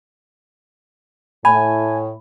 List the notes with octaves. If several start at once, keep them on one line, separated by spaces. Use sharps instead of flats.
A2 G#5 B5